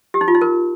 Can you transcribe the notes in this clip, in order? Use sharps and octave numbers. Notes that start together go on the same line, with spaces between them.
G4
D#4
F4
D#4
A#4